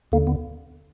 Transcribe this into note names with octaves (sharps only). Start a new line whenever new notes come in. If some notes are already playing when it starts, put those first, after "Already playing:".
D#2 D3 A#3
B3